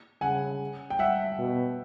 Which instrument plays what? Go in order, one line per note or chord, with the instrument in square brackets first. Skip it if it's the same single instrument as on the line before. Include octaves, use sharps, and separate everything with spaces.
[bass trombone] C#3 [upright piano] F#5 G#5
[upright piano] G5
E5 F#5
[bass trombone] B2